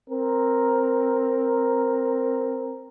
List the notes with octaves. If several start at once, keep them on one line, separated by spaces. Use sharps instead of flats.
C4 A#4